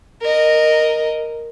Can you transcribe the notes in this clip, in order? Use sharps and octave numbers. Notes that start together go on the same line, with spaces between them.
A#4 D#5